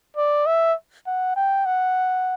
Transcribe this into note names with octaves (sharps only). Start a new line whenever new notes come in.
D5
E5
F#5
G5
F#5